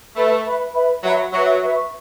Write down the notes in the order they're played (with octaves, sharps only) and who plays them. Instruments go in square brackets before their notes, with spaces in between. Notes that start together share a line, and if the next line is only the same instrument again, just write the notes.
[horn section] A3 [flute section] B4 E5 B5
[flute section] B4 E5 B5
B4 E5 B5
[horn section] F#3 [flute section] B4 E5 B5
[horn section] F#3 [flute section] B4 E5 C#6
[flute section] B4 E5 C#6